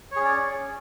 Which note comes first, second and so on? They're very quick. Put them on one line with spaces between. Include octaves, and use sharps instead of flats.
C#5 G#4 C#4 D5